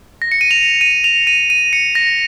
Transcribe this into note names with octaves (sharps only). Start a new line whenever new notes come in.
A#6
C#7
D#7
F7
D#7
F7
D#7
D#7
C#7
A#6